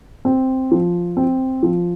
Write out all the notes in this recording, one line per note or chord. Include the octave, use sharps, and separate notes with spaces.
C4
F3
C4
F3